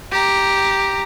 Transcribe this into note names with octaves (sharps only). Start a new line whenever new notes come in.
G4 A#5